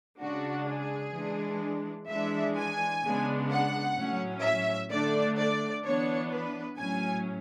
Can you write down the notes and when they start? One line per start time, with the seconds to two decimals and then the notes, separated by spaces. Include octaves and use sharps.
0.20 C#3 G#3 D4 F#4
0.67 G#4
1.15 E3 G#3 D4
2.08 E3 G#3 D4 E5
2.55 G#5
3.03 C#3 G#3 B3 D4
3.49 F#5
3.96 A2 F#3 C#4
4.43 E5
4.91 D3 A3 D4 D5
5.38 D5
5.84 E3 B3 D4 C#5
6.31 B4
6.78 A2 F#3 C#4 G#5